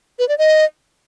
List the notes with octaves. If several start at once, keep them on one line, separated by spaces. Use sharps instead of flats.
B4
D5
D#5